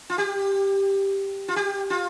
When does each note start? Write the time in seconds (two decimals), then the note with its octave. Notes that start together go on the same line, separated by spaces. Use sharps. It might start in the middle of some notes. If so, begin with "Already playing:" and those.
0.10 F4
0.18 G4
1.48 F4
1.56 G4
1.90 F4